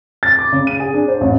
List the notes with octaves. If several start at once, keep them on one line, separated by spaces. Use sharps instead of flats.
A6
D6
C#3
D#7
G#4
D4
C5
A1